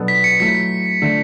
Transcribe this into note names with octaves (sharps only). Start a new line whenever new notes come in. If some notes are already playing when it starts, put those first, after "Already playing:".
Already playing: B2 F#3 B3 D4 A4
B6
C#7
F#3 A3 E4 B6
D3 A3 D4